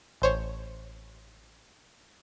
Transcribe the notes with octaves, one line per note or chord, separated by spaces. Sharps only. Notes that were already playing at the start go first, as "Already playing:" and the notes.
A1 C5 C#5